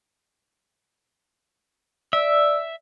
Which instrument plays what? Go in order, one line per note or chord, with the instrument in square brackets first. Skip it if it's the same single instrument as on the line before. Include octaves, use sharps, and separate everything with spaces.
[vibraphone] D5 E6 [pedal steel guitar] E5